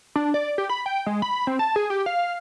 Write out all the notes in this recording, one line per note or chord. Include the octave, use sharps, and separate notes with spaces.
D4
D5
G4
B5
G5
G#3
B5
C4
A5
G#4
G4
F5